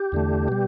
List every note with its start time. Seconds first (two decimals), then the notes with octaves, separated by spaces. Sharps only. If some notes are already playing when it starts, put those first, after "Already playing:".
Already playing: G4
0.12 E2 D3 A3
0.48 B2 G3